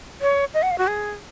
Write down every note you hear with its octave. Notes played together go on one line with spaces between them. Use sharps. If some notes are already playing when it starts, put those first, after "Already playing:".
C#5
D#5
F#5
F5
F#4
G#4